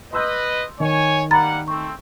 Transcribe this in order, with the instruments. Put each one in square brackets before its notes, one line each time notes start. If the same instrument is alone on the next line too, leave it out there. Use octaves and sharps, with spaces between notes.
[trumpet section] B4 D#5 [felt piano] C6 E6 G6
[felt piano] D#3 [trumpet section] C#5 G#5
[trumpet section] G3 A#3 F#5 [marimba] A#5 B5 A6
[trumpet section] A3 C4 [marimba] C#6